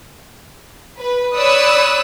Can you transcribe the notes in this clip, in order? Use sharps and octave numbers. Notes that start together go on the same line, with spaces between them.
B4
C#5 D5 B5 D#6 E6 F#6